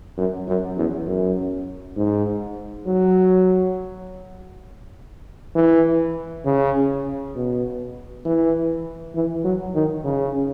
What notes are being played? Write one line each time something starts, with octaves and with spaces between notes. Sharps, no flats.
F#2
F#2
E2
F#2
G#2
F#3
E3
C#3
B2
E3
E3
F#3
D#3
C#3